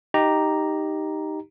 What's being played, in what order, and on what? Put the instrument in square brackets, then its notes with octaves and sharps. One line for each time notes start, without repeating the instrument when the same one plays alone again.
[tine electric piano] D#4 G4 A#5